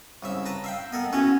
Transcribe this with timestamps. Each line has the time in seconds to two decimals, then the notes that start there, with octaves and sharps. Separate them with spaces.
0.23 C2 C#3 E5
0.46 B4 A5 A#5
0.64 E5 F5 G5
0.92 B3 A4 A#4 D#5
1.13 C#4 E4 F#4 B4